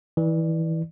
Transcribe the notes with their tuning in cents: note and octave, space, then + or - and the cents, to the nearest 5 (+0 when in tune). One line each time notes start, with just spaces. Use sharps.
E3 -25 D5 +15